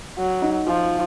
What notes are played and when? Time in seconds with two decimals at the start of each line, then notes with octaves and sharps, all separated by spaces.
0.18 F#3
0.42 D#4
0.67 F3 F4